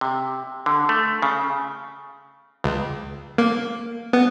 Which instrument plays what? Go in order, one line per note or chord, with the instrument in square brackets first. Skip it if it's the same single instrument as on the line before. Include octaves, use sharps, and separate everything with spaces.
[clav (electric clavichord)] C3
D3
A3
C#3
[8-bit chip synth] C#2
A#3
B3